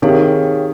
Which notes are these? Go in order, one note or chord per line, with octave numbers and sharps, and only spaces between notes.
C3 D#3 G#4 C#5 F5